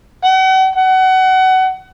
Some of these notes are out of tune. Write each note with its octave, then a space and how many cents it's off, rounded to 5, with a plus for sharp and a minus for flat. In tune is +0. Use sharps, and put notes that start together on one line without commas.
F#5 +40
F#5 +25